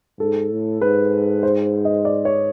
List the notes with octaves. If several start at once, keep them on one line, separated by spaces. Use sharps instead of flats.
G#2 A4
A2
G#2 B4
C5
D#5
D5
C#5